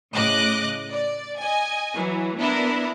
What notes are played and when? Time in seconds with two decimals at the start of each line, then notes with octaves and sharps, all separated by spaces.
0.12 A2 C#3 D#5 D6 F#6
0.92 D5
1.38 D#5 G#5
1.95 E3 F#3
2.37 B3 D4 E4 A#4